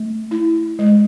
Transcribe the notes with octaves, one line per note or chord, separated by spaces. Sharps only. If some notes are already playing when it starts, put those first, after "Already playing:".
Already playing: A3
E4
G#3